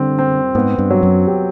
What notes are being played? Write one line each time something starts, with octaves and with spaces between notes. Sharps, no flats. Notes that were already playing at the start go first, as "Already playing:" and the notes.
Already playing: D3 G3 C4
C4
G#2 B3
G2
F#3
F#2
G4